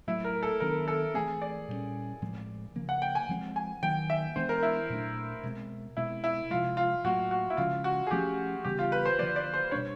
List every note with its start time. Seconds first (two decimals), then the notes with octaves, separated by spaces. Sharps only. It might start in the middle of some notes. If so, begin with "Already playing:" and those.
0.07 A2 F#3 A3 E4
0.24 A#4
0.43 A4
0.60 D#3 F#3 B3 D4 A#4
0.88 A4
1.14 E3 A3 C4 G#4
1.42 D5
1.68 A#2 G3 A#3 C#4
2.22 A2 F3 G#3 C4
2.75 C#3 F3 A#3
2.89 F#5
3.02 G5
3.15 G#5
3.29 F3 G#3 C4
3.56 G#5
3.82 D#3 F#3 A#3 G5
4.10 E5
4.36 E3 G#3 B3 D4 C5
4.49 A#4
4.63 E4
4.89 A#2 F#3 A3 D4
5.43 B2 G#3 C4
5.97 B2 G#3 C4 E4
6.24 E4
6.50 C3 F3 G#3 F4
6.77 F4
7.04 A2 F#3 A#3 F#4
7.31 F#4
7.50 E4
7.57 C#3 F3 G#3 F4
7.84 F#4
8.07 G#4
8.11 F3 A3 C#4 G4
8.64 C#3 E3 G3 B3 G4
8.79 F4
8.92 B4
9.06 C5
9.18 D3 F3 A#3 D5
9.36 D5
9.54 C5
9.71 B2 G3 A#3 D4 C#5